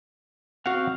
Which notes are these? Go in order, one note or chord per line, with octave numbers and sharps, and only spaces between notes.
C4 F#4 F5 F#5